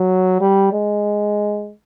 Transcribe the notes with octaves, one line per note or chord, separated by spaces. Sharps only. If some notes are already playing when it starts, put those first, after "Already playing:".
Already playing: F#3
G3
G#3